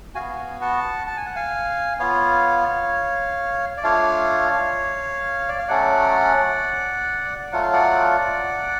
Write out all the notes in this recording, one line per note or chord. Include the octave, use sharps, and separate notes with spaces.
B3 F#4 F5 G#5
F#5 A5
A5
G#5
F#5
F5 G#5
B3 F4 C#5 F5
D5
A3 D4 F4 C#5 F5
D5
F5
F#3 A3 C#4 D5 F#5
F#3 A3 F4 F#5
F5
D5 F#5